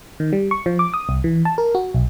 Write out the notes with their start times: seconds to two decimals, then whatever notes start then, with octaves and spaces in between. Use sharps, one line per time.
0.20 D#3
0.33 G3
0.51 C#6
0.66 F3
0.79 D6
0.94 D#6
1.09 C2
1.24 E3
1.45 A5
1.58 A#4
1.75 F#4
1.94 B1